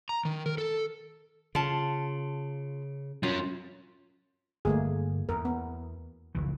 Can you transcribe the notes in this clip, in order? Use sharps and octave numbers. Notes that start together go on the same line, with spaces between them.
A#5
D#3
A#4
A4
C#3 F4 A5
F#3 C#4 F4
G1 A3 A#3 G#4
E2 A#4
B3
F1 C#2 E3